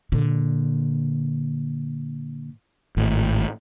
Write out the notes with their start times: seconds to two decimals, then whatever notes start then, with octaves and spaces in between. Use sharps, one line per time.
0.12 A#2 D3
2.97 G#1 A2